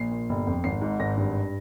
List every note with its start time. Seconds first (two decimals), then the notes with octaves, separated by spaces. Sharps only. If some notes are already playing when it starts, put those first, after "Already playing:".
Already playing: A#1 C7
0.12 A#2
0.29 G1
0.47 F2
0.64 G#1 C7
0.82 G#2
1.00 G#1 A#6
1.17 G2